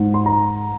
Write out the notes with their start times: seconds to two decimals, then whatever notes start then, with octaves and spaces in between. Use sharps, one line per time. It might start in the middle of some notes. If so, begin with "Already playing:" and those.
Already playing: G#2
0.14 C6
0.26 A#5